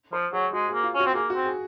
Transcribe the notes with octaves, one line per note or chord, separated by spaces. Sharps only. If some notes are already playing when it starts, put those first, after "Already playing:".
F3 C5
F#3 G#4
G#3 F#4
G#4
A#3
F4
C#4 F#4
C4
A#3 G#4
F#4
C4
G#4